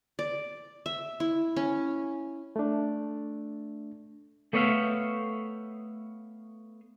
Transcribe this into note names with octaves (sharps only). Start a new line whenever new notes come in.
D5
E5
E4
C#4
A3 D4
A3 B3 C#5 D5 E5 F5